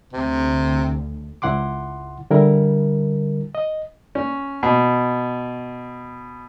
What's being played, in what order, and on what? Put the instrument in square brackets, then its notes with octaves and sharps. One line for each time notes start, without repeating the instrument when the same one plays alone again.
[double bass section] D2 [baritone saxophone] C3
[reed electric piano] C#2 E4 F#5 C6 D6
D3 G3 E4 A#4
D#5
[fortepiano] C#4
B2